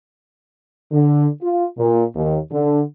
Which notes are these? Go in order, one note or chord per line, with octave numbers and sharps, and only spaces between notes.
D3
F4
A#2
D#2
D3